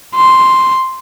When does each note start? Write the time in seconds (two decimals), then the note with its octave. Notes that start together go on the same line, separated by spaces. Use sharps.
0.15 C6